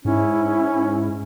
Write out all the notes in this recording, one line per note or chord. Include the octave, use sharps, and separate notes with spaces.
G#2 C#4 E4